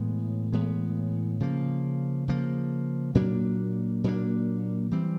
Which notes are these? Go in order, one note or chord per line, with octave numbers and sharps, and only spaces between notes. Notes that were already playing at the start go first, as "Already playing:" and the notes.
Already playing: A2 E3 G#3 B3
A2 E3 G#3 B3
C#3 F3 A#3
C#3 F3 A#3
A#2 F#3 A#3 D4
A#2 F#3 A#3 D4
E3 G3 C4